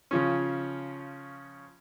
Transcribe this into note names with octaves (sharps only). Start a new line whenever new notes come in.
C#3 F3 C#4